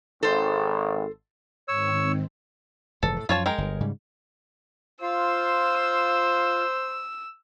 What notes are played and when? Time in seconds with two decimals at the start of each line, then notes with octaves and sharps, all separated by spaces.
0.23 G#1 A4 C5
1.68 G#2 D#3 C4 C#5 E6
3.03 F1 G#2 E3 A4
3.16 A2
3.29 F#2 F3 F4 C#5 A5
3.46 G#3 A#4 G5
3.58 G1
3.80 G#2 C#3 G3
5.02 F4 C5 F5 E6